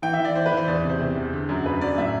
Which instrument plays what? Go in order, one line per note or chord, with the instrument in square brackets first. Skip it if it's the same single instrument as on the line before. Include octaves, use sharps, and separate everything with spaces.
[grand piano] E3 G5
E5
E3
D5
E3 C5
B4
E3
C5
E2 D5
C3
C5
C3
E2
D3
F#2
F#2 B4
F#2 D5
A2 E5